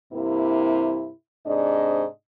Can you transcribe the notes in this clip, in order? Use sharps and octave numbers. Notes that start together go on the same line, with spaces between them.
G2 C3 A#3 E4
G#2 C3 D4 D5 D#5